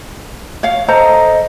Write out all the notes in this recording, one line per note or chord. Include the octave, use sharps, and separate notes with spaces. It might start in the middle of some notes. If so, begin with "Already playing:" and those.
C#5 F5
A4 C5 D#5 A#5